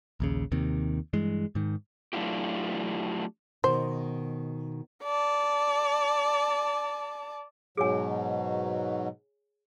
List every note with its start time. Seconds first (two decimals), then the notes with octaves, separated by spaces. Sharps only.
0.20 A#1 D#2 C#3
0.52 D#2 C3 D#3
1.13 G2 E3 G#3
1.55 G#2 D#3
2.13 F#3 A3 D4 E4 F4 G4
3.64 B2 D#3 C5
5.03 D5 A5
7.77 G#2 B2 F#3 G#4 C#5 G#5